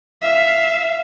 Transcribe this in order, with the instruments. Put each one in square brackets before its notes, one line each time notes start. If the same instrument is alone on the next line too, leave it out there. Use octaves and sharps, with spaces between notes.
[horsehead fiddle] E5 F5